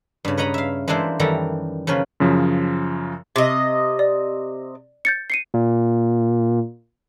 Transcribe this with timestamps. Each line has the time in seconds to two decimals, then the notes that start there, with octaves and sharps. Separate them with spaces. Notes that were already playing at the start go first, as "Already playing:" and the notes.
0.25 G2 C#3
0.37 B4 C#5 D#5 A#5 B5
0.54 E5 F5
0.88 E3 G#3 A#3 D4 E4 C5
1.19 F#2 D#3 E3 G3 A4 A#5
1.87 C#3 F3 A#3 C#4 B4
2.20 F#2 C#3 F3
3.36 C3 D#5
3.99 D5
5.05 G6 A6 C#7
5.30 C7 C#7 D#7
5.54 A#2